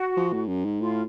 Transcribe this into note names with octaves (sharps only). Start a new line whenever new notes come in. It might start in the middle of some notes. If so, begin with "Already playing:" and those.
Already playing: F#4
F3
A2
F#2
G#2
A2 F4